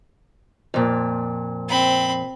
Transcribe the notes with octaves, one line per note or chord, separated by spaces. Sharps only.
F2 A#2
C4 B5